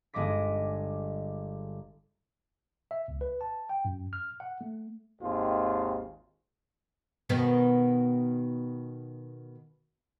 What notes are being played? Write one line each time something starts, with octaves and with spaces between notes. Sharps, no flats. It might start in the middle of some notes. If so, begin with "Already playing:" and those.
G1 G#3 D#5 D6 B6
E5
C#2
B4
A5
G5
F#2
F6
F#5
A3
G#1 D#2 F4
B2 D#3 B3